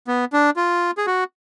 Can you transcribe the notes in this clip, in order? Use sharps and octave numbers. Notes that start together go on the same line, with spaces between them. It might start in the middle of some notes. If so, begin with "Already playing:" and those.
B3
D4
F4
G#4
F#4